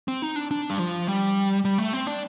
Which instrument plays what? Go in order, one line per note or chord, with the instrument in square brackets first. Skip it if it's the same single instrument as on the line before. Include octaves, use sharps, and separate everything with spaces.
[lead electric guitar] C4
D#4
D4
D4
G3
F3
G3
G3
A3
C4
D4